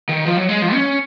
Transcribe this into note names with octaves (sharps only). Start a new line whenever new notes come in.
D#3
F3
F#3
G#3
F3
C#4